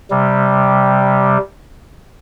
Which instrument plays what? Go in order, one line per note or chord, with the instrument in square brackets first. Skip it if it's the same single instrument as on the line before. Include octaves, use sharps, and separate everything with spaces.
[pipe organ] C3 G3